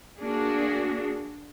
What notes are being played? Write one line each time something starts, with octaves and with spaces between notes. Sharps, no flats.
A#3 D4 F#4 G#4